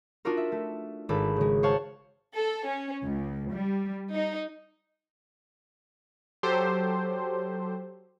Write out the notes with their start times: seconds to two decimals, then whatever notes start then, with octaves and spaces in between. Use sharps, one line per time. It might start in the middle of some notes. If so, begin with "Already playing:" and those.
0.25 D4 D#4 F4 F#4 A#4
0.37 E5
0.52 A3
1.09 G#1 A4 B5
1.36 C#3 G#3
1.63 C5 C#5 F5 F#5 A5 C#6
2.34 A4
2.67 C#4
3.03 C#2
3.52 G3
4.13 D#4
6.43 F#3 G4 A4 C5